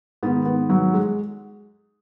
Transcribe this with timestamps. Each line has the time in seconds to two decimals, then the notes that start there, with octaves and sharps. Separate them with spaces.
0.23 G#2 D#3 B3
0.45 B3
0.70 F#3
0.94 G#3